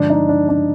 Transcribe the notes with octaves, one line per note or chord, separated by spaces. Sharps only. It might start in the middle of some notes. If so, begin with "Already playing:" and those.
Already playing: G2 D3 F3 G#3 D4
D#4
D4
D4